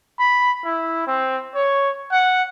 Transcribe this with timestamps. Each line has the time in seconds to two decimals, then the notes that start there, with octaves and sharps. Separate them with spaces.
0.19 B5
0.65 E4
1.07 C4
1.55 C#5
2.12 F#5